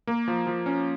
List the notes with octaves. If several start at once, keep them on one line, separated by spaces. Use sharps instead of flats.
A#3
F3
F3
C#4